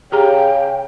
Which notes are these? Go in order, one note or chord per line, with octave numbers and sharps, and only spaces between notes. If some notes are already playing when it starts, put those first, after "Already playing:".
C#3 G4 G#4 G5 A#5